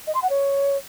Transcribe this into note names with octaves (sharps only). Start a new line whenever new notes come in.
D#5
C6
F#5
C#5